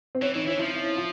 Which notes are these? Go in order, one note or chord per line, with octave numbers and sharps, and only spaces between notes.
C4
E3 C#4
E3 D#4
E3 E4
F3 E4
F4